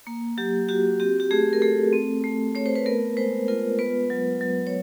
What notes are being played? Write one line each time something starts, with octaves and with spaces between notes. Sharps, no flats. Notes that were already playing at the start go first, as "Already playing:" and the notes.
A#3
F#3 G4
F#4 G4
C4 G4
G4
A3 G#4
A#4
A3 A4
C4
A3
A3 C#5
C5
B4
B3 A#4
G#3 C5
F4 A#4
B3 B4
F#3
F#3
C#5